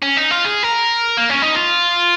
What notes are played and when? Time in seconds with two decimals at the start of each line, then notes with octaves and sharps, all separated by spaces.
0.03 C#4
0.17 D#4
0.31 F4
0.45 G#4
0.63 A#4
1.17 A#3
1.30 C#4
1.42 D#4
1.55 F4